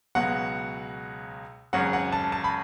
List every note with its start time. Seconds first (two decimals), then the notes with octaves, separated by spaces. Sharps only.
0.15 C#2 B2 F#3 F#5
1.73 G#1 F#2 C#3 F#3 F#5
1.93 F#5
2.12 A5
2.32 A5
2.44 B5